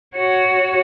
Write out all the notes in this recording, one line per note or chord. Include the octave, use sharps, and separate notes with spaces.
F#4 C#5